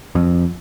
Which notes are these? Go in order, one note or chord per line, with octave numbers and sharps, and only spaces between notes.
F2